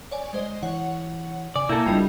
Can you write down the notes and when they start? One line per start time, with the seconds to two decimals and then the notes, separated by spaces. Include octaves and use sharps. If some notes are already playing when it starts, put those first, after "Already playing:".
0.11 C#5 D5 G#5
0.33 G#3 C5 D#5
0.63 E3 C#5 F#5
1.56 C#3 D5 G#5
1.69 B2 A#3 E4 A4 G6
1.86 F#1 G3 C#4 D4 F4 A#4 D#5